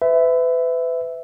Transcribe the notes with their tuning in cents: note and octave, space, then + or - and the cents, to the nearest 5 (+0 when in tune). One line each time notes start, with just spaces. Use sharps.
B4 +35 E5 +0